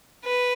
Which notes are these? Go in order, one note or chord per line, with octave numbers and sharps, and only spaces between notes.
B4